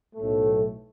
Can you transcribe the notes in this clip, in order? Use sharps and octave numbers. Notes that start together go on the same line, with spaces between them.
B1 A2 A3